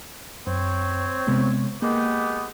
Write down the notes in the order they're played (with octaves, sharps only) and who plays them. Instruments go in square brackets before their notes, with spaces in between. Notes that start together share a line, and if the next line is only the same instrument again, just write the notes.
[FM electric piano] F#2 [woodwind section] C4 C#5
[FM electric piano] C3 G#3 B3
[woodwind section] G#3 B3 G4 [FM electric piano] A#3